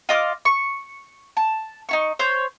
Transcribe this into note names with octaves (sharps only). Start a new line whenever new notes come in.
F4 D#5 D6 F6
C#6
A5
D#4 E4 C#6
C5 C#5 G6